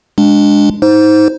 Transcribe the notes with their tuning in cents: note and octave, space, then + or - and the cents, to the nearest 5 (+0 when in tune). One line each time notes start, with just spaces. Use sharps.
G#3 +0 D4 +0
D#4 +25 C5 +0